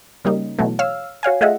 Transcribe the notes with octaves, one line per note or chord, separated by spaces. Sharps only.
C#3 G3 A#3 D#4
B2 E3 F#3 A3
C#5 F5 E6 F6
F#4 C#5 F5 G#5
A3 F4 G#4 D#5 E5 F#5